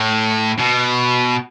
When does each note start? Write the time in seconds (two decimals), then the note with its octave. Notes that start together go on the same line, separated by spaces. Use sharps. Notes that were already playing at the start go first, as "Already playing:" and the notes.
Already playing: A2
0.59 B2